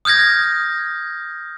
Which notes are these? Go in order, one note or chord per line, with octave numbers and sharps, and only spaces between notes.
D#6 F6 G6 G#6 A#6